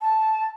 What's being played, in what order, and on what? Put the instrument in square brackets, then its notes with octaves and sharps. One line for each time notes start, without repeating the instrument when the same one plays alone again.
[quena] A5